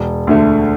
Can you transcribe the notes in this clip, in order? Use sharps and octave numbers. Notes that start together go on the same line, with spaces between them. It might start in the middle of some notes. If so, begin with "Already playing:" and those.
Already playing: E1
D2 D3 A3